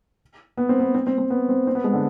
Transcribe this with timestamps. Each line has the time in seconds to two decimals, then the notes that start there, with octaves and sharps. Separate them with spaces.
0.57 B3
0.69 C4
0.80 B3
0.95 C4
1.07 C4
1.18 C4
1.30 B3
1.49 C4
1.67 C4
1.75 B3
1.84 G#3
1.93 D3